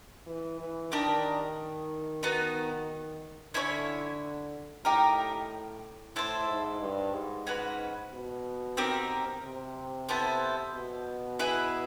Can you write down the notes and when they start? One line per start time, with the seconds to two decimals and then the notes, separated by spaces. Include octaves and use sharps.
0.26 E3
0.60 E3
0.92 D#3 D4 G4 A#4 D#5
2.23 B3 D#4 F#4
3.54 D3 C#4 E4 A4 C#5
4.85 A2 D#4 G4 A#4
6.16 A2 E4 A4 C5
6.48 G#2
6.81 G2
7.14 G#2
7.47 C#4 F#4 B4
8.12 B2
8.77 C4 D#4 G4 A#4
9.43 C3
10.09 B3 E4 A4 C5
10.74 B2
11.39 E4 G#4 B4